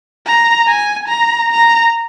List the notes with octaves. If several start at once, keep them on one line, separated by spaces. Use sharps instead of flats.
A#5
G#5
A#5
A#5